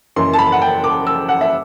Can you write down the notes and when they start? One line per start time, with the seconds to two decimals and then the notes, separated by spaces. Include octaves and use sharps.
0.16 F#1 F#2 E3 C6
0.33 A5
0.38 B5
0.52 F#5
0.62 G5
0.84 D6
1.07 E6
1.29 F#5
1.41 E5